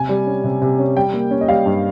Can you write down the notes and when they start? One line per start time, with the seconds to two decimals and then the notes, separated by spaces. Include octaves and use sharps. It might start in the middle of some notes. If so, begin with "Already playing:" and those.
Already playing: C3 G#5
0.09 G3
0.27 C#4
0.44 C3
0.62 C3
0.79 C#4
0.96 G3 G5
1.13 A#3
1.31 C#4
1.41 D#5
1.48 G3 F5
1.66 G2